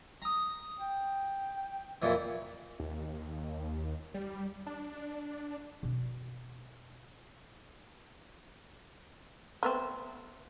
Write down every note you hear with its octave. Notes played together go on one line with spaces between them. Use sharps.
A#5 D#6
G5
F2 A#2 E3
D#2
G3
D4
B2 D#4
A3 B3 C4